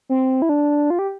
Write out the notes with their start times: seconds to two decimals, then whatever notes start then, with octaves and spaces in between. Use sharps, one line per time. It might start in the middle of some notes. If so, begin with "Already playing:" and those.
0.09 C4
0.42 E4
0.49 D4
0.90 F4
0.99 G4